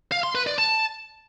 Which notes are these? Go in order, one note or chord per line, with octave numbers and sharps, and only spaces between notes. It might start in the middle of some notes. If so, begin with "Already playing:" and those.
F5
C6
B4
D5
A5